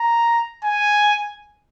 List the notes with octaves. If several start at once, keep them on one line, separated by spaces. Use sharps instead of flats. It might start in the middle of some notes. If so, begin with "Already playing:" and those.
Already playing: A#5
G#5